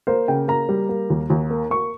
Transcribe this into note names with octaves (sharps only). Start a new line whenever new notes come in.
A#3 C5
C#3 G5
A#3 A#5
G3
A#3
D#2
D#2
A#3
A#3 C#6